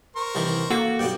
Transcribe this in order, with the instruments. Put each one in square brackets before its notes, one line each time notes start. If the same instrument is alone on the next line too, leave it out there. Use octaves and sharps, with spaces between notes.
[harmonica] A#4 C5 C#6
[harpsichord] C2 D#3 E3
[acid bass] A#3 [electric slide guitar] F#4 [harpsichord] A4
[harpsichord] B1 G2 [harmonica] D5 G5